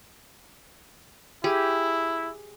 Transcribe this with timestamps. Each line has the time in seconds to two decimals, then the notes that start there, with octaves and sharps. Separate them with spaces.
1.44 E4 G4 G#4